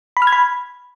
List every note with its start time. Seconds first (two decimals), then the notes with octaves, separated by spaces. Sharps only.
0.17 B5
0.22 F6
0.27 G#6
0.32 B5